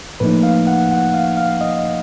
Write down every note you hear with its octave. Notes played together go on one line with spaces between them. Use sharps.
A2 F3 A#3 D#4 B4
F5
F#5
F#5
F5
F5
D#5